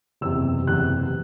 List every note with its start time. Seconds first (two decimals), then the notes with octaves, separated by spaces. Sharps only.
0.21 F#1 E2 C3 E6
0.66 F#1 E2 C3 F#6